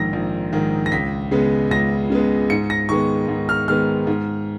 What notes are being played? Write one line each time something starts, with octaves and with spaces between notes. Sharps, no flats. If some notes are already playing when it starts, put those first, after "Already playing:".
Already playing: A#1 G#2 D#3 A#6
A#1
G#2 D#3
A#6
C#2 B6
C#3 G#3 B3
C#2 A#6
C#3 G#3 B3
G#2 C#7
A#6
D#3 G#3 B3 C#6
G#2
F6
D#3 G#3 B3 F6
G#2